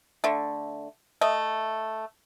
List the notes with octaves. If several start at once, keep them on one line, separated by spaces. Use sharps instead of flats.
D3 A3
A3 D#5